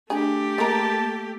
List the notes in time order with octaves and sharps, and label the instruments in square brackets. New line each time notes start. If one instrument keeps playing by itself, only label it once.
[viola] A3 G4 [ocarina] D4 [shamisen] G#4
[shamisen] G#3 A#4 [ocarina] A#3 [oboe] A5